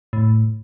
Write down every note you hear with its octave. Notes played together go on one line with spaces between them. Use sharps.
A2